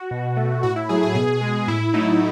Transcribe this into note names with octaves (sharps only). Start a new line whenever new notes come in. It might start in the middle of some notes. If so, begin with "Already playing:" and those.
Already playing: F#4
B2
A3
A2 F#4
E4
F#3 A3 G#4
G#4
B2 G#4
G#3
A2 E4
F#3 A3 D#4